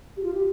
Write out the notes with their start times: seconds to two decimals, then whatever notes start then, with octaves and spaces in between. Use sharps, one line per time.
0.17 G4
0.23 F4
0.34 G4